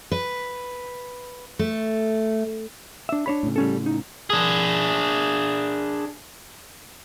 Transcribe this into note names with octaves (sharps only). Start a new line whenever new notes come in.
B4
A3
D4 E5
D4 C#5 B5
A2 C#3
G3 C#4 A4
D#4
D4 G#4